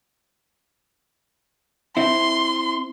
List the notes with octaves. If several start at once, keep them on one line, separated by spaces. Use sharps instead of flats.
C4 E4 C6